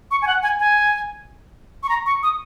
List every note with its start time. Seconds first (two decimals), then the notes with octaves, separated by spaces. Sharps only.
0.11 C#6
0.22 G#5
0.27 F#5
0.43 G#5
0.59 G#5
1.83 C#6
1.89 A#5
2.06 C#6
2.23 D#6